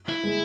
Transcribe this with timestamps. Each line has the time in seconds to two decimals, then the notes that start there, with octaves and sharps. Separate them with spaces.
0.09 E4
0.24 G#3